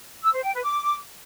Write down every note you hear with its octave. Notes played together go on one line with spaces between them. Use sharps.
E6
C5
G5
B4
D6